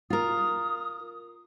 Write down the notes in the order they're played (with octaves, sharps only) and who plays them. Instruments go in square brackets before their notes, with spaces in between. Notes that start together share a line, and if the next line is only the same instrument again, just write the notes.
[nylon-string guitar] F4 A#4 [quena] D#6